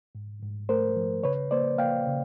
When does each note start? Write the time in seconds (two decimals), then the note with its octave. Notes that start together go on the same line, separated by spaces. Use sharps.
0.15 G#2
0.42 G#2
0.69 A3 A#4 C5
0.96 F3
1.24 C#3 B4 C#5
1.51 A#3 C5 D5
1.78 A#3 F5 G5
2.07 C#3